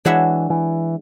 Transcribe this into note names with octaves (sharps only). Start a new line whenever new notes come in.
E3 G#3 D4 F#4 C#5 E5
E3